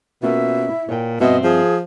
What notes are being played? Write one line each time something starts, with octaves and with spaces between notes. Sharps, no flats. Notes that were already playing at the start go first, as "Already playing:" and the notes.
B2 A#3 C#4 F4 E5
E4
A#2 C#5 G5
G2 B2 C4 D#5 E5
F3 G#4